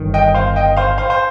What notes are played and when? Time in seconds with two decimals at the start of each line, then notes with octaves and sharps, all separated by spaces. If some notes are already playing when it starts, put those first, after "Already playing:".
Already playing: G1 G2 D#3
0.14 D#5 G5
0.34 C5 F5
0.56 D#5 G5
0.77 C5 F5
0.98 C5 F5
1.10 C5